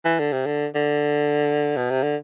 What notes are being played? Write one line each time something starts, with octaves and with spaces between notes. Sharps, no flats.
E3
D3
C3
D3
D3
B2
C3
D3